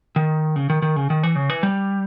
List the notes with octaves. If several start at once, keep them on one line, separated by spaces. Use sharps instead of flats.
D#3
C#3
D#3
D#3
C#3
D#3
E3
C#3
E3
G3